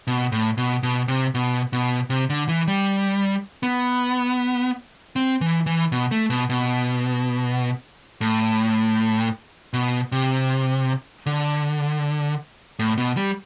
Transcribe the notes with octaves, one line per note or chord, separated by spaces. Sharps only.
B2
A2
B2
B2
C3
B2
B2
C3
D3
E3
G3
B3
C4
E3
E3
B2
A3
B2
B2
A2
B2
C3
D3
A2
B2
G3